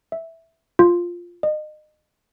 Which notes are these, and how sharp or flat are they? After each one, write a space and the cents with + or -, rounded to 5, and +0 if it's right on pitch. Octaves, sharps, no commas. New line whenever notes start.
E5 -5
F4 +0
D#5 -30